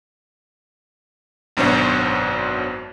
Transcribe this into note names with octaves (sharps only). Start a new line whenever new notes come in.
G#1 F#2 B2 D4 C5 C#5